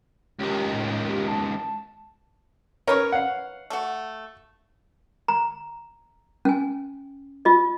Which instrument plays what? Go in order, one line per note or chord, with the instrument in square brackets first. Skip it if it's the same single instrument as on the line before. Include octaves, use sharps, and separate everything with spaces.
[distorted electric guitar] C#2 D#3 [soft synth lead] G4
[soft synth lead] A2
G4
A5
[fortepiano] C#4 A#4 [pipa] D#4 B4 C#5
[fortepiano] F5 F#5
[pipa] A3 F#4
[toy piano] A#5
C#4 G#5
F4 D#5